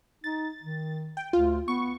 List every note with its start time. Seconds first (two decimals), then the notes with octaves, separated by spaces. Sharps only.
0.24 D#4 A6
0.63 D#3
1.17 G5
1.33 D2 F4
1.68 B3 C#6